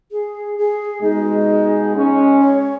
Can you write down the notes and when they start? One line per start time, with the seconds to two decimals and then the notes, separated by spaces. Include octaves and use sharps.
0.11 G#4
0.58 G#4
1.01 B2 G#3 D#4
1.95 G#3 C#4
2.40 C#5